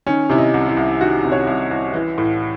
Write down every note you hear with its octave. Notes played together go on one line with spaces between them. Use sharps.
D#3 C#4
C3 E4
D#4
C2
E4
C2
D#3 F#4
C3
C#5
C2
C2
E3
A2